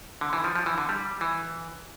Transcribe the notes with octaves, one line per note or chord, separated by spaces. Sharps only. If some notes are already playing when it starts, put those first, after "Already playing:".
D3
E3
F3
F3
E3
D3
G3
E3